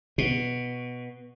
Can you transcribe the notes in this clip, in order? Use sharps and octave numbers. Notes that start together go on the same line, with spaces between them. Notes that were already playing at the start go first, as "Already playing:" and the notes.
B2